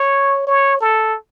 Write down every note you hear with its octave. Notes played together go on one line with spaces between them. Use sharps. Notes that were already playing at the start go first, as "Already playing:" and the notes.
Already playing: C#5
C#5
A4